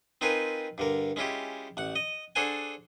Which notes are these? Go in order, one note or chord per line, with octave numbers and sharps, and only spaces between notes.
C4 D#4 F4 A#4 B4 G#5
G2 D3 A#4
G#3 C#4 E4 F4 G4
A1 F#5
D#5
D4 G#4 A4 C5 F#5 G#5